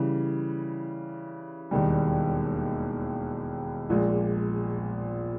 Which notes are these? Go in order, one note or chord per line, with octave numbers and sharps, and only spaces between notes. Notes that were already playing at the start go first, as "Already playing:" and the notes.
Already playing: C#3 E3 G3
E1 D#2 D#3 G3
A#1 A#2 G#3